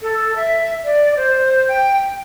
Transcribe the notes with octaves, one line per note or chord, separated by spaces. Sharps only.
A4
E5
D5
C5
G5